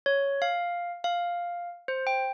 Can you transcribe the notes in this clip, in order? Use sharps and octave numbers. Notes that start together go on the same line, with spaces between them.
C#5
F5
F5
C5
G5